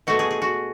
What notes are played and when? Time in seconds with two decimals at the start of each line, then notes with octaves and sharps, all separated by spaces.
0.07 B2 A3 F#4
0.19 G#4
0.31 G#4
0.42 F#4